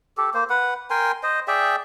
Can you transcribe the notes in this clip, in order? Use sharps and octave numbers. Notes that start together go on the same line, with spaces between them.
G4 A4
A#3 C5
B4 F#5
A#4 G5 G#5 C6
C5 D#5
G#4 D5 E5 G5